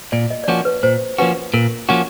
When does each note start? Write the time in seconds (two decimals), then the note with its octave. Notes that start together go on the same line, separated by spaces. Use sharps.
0.12 A#2 D5
0.31 D#5
0.44 D5
0.48 F3 A#3 C#4 F#4 C#5
0.65 B4
0.83 A#2 C5
1.18 F3 A#3 C#4 F#4 B4
1.54 A#2 A#4
1.89 F3 A#3 C#4 F#4